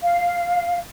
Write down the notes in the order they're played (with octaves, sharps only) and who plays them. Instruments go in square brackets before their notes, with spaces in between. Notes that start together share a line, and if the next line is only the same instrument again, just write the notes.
[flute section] F5